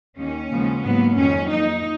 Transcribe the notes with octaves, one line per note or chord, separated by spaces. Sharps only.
D#2 D#3 A#3 C#4
D#2 C#3 F3 G#3 B3
G#2 F#3 A#3 B3
F2 D#3 F#3 C#4
F2 F3 A#3 D#4